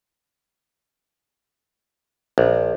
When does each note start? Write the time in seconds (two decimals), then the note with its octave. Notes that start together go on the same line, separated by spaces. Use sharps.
2.38 A#1